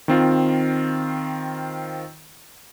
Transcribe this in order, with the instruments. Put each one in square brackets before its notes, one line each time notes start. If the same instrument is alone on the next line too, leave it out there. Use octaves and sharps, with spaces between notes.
[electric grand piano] D#3 C4 F4